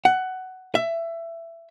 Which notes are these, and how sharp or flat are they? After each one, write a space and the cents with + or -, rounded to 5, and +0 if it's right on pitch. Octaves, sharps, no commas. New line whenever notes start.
F#5 +15
E5 +20